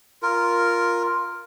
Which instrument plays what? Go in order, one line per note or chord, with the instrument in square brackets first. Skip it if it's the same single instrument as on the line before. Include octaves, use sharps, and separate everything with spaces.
[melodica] F4 A#4